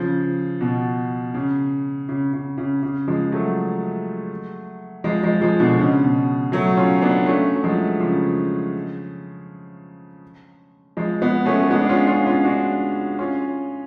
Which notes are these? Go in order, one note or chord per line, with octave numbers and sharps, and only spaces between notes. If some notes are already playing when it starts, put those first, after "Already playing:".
Already playing: C#3 F3
B2
C#3
C#3
C#3
C#3
C#3
F3 G#3
F#3 A3
F3 G#3
F3 G#3
F3 G#3
B2 D3
C#3
B2
F#3 A3
C#4 F4
B3 D4
A3 C#4
F#3
F3 G#3
C#3 F3
F3 G#3
G#3 B3
A3 C#4
A3
G#3 B3
D4
C#4 F4
C#4 F4
C#4 F4
D4 F#4
C#4 F4